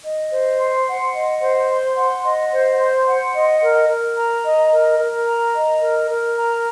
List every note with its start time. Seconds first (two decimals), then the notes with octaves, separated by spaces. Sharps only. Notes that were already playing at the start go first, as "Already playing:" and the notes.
0.03 D#5
0.31 C5
0.59 C6
0.87 F#5
1.13 D#5
1.41 C5
1.69 C6
1.97 F#5
2.24 D#5
2.51 C5
2.79 C6
3.07 F#5
3.34 D#5
3.62 A#4
3.89 A#4
4.17 A#5
4.44 D#5
4.71 A#4
4.99 A#4
5.27 A#5
5.54 D#5
5.81 A#4
6.10 A#4
6.37 A#5